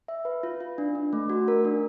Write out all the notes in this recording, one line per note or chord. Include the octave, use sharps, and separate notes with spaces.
E5
B4
F4
F4
D4
D4
A3
F#4
A#4
D4